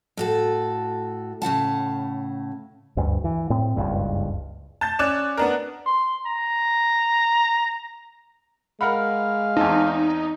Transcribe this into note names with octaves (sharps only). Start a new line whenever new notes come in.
A2 F#4 A4
A2 C#3 F#5 A5
D2 G2
E3
A2 C4
F#1 C#2 G2
A5 G6 A6
C#4 D5 F#6 E7
B3 D4 A#4
C6
A#5
G#3 A#4 F5 F#5 B5
E2 C4 D#4 A5